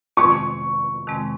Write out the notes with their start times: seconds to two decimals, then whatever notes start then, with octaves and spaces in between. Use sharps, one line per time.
0.17 F2 C3 D#3 G#3 C4 C#6
1.07 F2 C3 D#3 G#3 C4